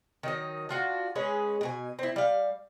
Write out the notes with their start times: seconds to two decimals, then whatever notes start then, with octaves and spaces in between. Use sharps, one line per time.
0.23 D#3 F#3 D#4
0.69 D4 F4 F#4
1.16 G#3 C#4 G#4 B4
1.61 B2 A#4 G#5
1.99 C4 E4
2.16 G3 F5